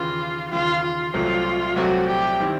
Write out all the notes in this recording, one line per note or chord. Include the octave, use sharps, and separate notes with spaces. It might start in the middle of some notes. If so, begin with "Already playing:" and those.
Already playing: D#2 C#3 E3 F4
D#2 C#3 E3 F4
F4
C2 A#2 F#3 A3 C4 F4
C2 A#2 F#3 A3 C4 F#4
G4
D#3 G3 C4 E4